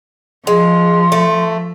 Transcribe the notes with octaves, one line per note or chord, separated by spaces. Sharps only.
F3 G#3 C6
A3